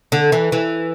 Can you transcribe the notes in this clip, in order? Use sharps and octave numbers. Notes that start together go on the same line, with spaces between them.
D3
E3
E3